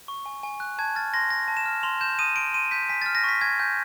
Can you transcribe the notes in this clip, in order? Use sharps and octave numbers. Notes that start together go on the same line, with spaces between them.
C#6
G#5
G#5
F#6
A5 G#6
F6 A6
C6 A#6
A5 A#6
A5
E7
F6
C6 F7
G6 E7
D#6 D#7
C6 D7
C6 D#7
G6 B6
G#5 B6
A6
F6
A#6
C#6 B6
G#5 G#6
G#5 G6